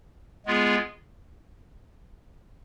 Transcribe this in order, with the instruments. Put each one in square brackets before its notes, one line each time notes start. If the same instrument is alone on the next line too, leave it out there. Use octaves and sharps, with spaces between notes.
[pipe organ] G#3 B3 F4 G#4